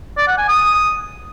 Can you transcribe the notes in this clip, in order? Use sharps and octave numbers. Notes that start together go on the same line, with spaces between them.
D5
F#5
G#5
D#6